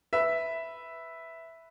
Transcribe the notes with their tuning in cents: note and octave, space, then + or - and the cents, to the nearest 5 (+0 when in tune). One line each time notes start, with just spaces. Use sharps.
B4 +0 E5 +0